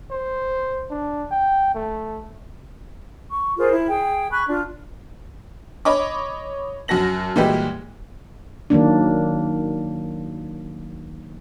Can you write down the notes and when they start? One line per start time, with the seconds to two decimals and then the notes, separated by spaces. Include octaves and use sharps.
0.11 C5
0.91 D4
1.31 G5
1.75 A3
3.31 C#6
3.58 F4 G#4 A#4 C5
3.73 E4
3.88 G#4 G5
4.31 G#5 B5 C#6 F#6
4.49 D4 F4
5.85 C#5 D#5 B5 D6
6.88 F#2 F#4 A5 A#6 F#7
7.36 A#2 E3 G3 G#3 F#4 G4
8.70 D#3 F#3 A#3 D4